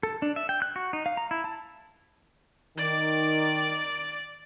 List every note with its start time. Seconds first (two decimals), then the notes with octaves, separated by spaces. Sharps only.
0.03 A4
0.22 D4
0.36 E5
0.49 G5
0.62 F#6
0.76 F#4
0.93 D#4
1.06 F5
1.17 A#5
1.31 E4
1.44 A5
2.78 D#3 D5 D6